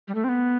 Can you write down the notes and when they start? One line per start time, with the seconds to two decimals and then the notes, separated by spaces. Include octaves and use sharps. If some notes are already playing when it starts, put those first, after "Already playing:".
0.08 G3
0.15 A3
0.24 C4
0.29 B3